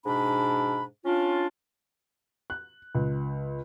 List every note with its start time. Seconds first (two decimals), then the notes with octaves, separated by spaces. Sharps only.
0.06 G#2 B2 D4 B5
1.05 C#4 D4 F4
2.50 F#6
2.95 C#2